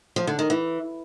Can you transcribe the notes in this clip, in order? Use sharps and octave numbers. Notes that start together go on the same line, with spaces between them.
F3
D3
D#3
E3